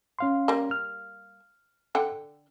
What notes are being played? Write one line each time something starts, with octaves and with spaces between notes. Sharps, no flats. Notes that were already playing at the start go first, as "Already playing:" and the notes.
C#4 F5 C6
G3 A#3
F6
D3 F#5 G5